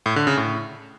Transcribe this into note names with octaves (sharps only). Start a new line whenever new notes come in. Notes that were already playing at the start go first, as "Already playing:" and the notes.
A2
D3
C#3
A2